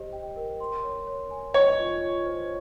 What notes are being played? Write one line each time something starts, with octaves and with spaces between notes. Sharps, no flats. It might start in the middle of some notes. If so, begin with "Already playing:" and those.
Already playing: G4 C5 D#5
G5
A#4
C6
C#5
C#5
G#5
C#5 D#5
F4
F4
C5